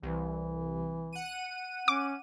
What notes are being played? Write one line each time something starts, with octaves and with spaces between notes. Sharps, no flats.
C2 E3
F#5 D#7
C#4 D6